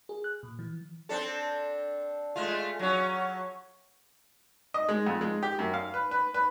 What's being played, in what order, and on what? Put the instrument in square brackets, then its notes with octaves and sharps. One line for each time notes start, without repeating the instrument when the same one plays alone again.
[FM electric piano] G#4
F#6
A#2
E3
[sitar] C4 D4 A4
G#3 A3 F4
F#3 C#4
[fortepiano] D#5
G#3
F2
G#3
G4
F#2
F5
B4
B4
B4